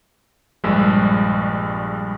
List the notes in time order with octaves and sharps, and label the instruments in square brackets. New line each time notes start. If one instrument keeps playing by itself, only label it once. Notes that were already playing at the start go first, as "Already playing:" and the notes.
[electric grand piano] A#1 G2 G3 G#3